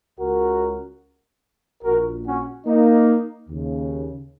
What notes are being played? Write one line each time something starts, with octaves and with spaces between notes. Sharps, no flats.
C#2 C#3 F#4 A#4
A#1 A#2 F#4 A#4
C#4 F#4
A#3 D#4
D#2 C#3